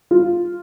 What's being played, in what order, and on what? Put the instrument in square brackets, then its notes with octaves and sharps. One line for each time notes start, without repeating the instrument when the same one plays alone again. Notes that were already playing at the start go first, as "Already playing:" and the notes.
[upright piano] F4